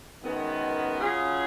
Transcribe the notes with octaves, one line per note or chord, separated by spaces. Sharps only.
F#2 D#3 G#3 B3
C#3 F#3 C#4 F4 G#4